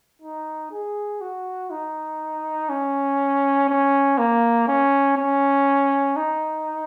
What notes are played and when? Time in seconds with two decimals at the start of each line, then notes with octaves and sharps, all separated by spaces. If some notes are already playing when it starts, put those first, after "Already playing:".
0.22 D#4
0.71 G#4
1.21 F#4
1.70 D#4
2.69 C#4
3.69 C#4
4.18 A#3
4.68 C#4
5.17 C#4
6.16 D#4